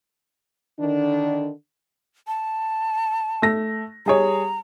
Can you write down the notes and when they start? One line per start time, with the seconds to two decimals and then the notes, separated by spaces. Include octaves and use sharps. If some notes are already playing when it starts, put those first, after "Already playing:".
0.80 D3 D#3 D4
2.27 A5
3.42 A3 A#6
4.06 G3 G#4 C#5 A#5